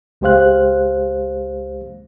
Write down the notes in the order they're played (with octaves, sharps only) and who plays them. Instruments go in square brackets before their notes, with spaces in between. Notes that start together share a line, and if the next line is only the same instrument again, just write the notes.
[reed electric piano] C#2 G#3 G4 C5 F5 F#6